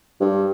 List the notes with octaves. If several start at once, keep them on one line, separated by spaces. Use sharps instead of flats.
G2